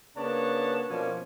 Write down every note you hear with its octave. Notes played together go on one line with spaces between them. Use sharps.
C#3 A#3 B3 D4 C#5 A5
B2 F3 A#3 C#4 D4